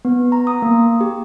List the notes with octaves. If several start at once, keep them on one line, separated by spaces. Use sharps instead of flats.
B3
A#5
D#6
A#3
G4